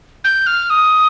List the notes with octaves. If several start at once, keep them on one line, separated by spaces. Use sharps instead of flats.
G6
F6
D#6